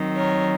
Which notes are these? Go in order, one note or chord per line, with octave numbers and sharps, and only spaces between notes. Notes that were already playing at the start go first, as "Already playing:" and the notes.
Already playing: D#3 F#3 C4 D#4
A#4 C#5